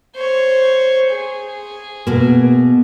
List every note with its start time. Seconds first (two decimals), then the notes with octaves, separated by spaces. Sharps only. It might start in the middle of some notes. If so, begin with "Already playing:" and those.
0.15 C5 C#5
1.10 G#4
2.07 B2 A#3